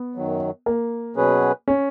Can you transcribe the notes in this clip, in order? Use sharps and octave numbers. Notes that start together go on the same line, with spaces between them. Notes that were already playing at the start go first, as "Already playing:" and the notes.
Already playing: B3
F#2 D#3 F#3
A#3
B2 F#3 C#4 G#4 B4
C#4